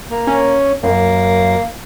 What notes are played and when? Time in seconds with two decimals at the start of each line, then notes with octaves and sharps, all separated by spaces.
0.11 A#3
0.27 C#4
0.83 F#2 A#3